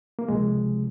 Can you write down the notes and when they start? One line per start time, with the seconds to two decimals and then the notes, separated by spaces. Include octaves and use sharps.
0.19 A#3
0.28 C#2 C3 F3 G#3